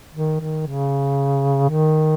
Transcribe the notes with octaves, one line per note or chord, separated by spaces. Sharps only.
D#3
D#3
C#3
D#3